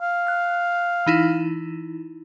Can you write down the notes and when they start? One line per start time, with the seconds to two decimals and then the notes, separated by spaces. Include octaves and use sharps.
0.01 F5
0.27 F6 F#6
1.06 E3 D#4 E4